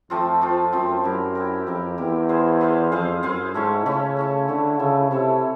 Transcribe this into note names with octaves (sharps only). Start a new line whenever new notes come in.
F2 F3 A3 C4 F4
F3 A3 C4 F4
F#2 F3 A3 C4 F4
F#2 E4 G4 A#4
E4 G4 A#4
F2 E4 G4 A#4
E2 E4 G4 A#4
E4 G#4 C5 F5
E4 G#4 C5 F5
F2 E4 G#4 C5 F5
F#2 E4 G#4 C5 F5
G#2 A3 C#4 E4
C#3 A3 C#4 E4
A3 C#4 E4
D3 A3 C#4 E4
C#3 E4 A4 C#5 E5
C3 E4 A4 C#5 E5